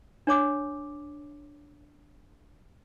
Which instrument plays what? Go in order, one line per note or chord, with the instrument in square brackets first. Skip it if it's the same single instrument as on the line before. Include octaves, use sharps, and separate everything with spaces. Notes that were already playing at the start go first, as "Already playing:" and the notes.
[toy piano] D4 C#5 D6